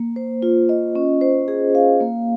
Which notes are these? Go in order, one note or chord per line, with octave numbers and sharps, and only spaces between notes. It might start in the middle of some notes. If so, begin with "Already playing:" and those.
Already playing: A#3
C5
F4
D#5
C#4
C5
G#4
F5
A#3